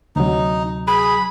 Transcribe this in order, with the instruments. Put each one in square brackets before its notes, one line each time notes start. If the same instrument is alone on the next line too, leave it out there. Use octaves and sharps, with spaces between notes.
[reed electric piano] D2 C3 F#3 [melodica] D#4
[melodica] G#4 [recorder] B5